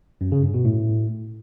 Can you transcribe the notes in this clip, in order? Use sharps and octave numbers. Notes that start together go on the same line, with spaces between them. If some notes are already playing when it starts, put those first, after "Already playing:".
F#2
C#3
G2
B2
A2